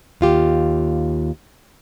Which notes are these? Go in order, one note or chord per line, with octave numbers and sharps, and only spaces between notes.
D#2 F4 G4